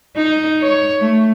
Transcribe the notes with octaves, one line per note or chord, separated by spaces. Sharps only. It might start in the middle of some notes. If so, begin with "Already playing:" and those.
D#4
C#5
A3